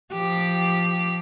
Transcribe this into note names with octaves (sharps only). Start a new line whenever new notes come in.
F3 G4